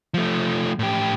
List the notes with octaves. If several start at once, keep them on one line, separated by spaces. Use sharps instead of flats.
F3 A3
A2 G4